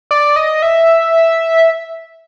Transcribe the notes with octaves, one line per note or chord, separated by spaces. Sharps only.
D5
D#5
E5